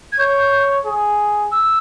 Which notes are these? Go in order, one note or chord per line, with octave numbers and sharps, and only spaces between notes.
G#6
C#5 G6
G#4
E6